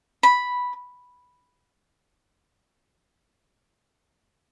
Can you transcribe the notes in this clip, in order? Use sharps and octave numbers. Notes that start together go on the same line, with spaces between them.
B5